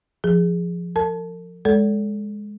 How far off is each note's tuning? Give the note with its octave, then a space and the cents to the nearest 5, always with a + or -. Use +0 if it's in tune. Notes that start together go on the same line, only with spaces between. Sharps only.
F3 +0 G#4 -5
A#4 -45 A5 -10
G#3 +0 A4 +0 D5 -40